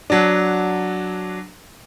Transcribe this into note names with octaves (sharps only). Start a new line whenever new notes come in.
F#3 D4